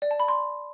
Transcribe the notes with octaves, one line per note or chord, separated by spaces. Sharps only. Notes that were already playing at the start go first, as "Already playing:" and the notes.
D5
A5
B5
C6